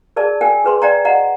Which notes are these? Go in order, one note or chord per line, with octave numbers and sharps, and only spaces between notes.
G#4 A#4 D5 A5
A#4 G5 G#5
G#4 B4 C6
D5 G5 A#5
D#5 F#5 A#5